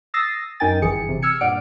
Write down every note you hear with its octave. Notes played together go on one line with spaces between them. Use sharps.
D#6 E6 A6 A#6 C7
F#2 D#4 A#4 G5 G#5 A6
G1 E3 G#4 C#7
C3
E6 F6 G#6 C#7
G2 A#2 D5 F#5 F6 D7